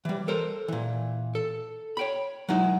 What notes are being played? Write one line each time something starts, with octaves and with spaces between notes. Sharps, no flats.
E3 G3
A4 A#4 C5
A#2 E3
A4
C#5 G5 B5
F#3 G#3 D#4 E4